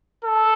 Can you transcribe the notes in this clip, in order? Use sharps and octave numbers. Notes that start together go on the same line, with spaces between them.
A4